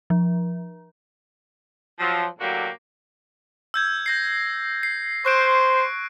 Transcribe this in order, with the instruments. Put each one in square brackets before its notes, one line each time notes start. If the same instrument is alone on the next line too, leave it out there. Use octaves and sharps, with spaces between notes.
[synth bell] F3
[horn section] F3 F#3
A2 D3 F#3 A#3 F#4 G4
[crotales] E6 G6 G#6
G6 A#6 C7
C7
[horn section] C5 [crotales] C#6 F#6 D7